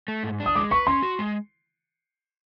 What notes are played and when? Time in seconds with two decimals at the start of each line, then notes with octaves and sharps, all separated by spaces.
0.08 A3
0.23 G#2
0.40 D4
0.46 D#6
0.55 G#3 D6
0.71 B4 C#6
0.87 C#4 C6
1.03 F#4
1.19 G#3